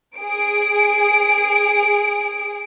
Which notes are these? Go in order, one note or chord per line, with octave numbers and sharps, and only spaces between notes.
G#4 D7